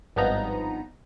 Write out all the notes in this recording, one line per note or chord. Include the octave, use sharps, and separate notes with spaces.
G#1 G2 F3 B3 D#4 A#5